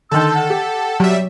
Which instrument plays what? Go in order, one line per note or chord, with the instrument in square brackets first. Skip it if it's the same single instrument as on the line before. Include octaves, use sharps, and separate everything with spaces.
[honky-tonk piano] D3 D#3 A5 [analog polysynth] A4 [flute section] C6 E6 G6
[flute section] F#5
[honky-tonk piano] G4
[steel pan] F#3 [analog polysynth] G3 E5